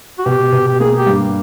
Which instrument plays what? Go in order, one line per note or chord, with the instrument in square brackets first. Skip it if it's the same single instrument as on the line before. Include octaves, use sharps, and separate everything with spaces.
[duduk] F#4
[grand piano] B2 [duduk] G4
[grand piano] B2
[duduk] G4
[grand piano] A#3 [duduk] G#4
[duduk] G4
[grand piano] G2